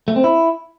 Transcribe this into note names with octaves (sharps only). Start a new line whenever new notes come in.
A3
C4
E4